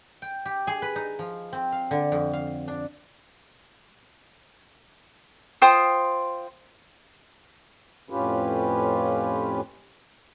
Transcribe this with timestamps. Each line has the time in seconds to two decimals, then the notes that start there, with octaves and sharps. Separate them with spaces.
0.22 G5
0.45 G4
0.67 G#4
0.82 B4
0.96 D#4
1.19 F3
1.53 C4
1.72 F5
1.91 D3
2.12 F2
2.33 F5
2.68 D4
5.62 F4 C5 G5 D#6
8.10 F2 A2 C#4 F4 G4 B4